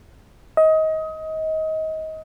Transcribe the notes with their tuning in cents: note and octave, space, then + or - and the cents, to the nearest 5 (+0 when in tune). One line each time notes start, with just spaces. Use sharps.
D#5 +25